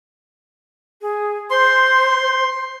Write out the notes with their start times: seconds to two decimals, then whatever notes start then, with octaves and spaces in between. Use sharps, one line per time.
1.01 G#4
1.51 C5 C6